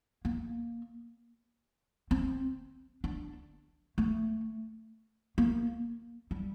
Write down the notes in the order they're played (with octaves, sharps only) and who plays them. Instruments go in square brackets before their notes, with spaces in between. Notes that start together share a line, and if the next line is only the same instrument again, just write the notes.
[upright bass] A#3
C4
D4
A3
A#3
G3